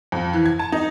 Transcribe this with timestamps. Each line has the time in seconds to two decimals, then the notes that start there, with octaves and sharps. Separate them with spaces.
0.12 F2
0.33 E3
0.46 G#6
0.59 A5
0.72 D#4